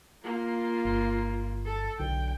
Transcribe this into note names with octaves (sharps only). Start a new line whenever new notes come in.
A#3 F4
G1
A4
B1 D3 G5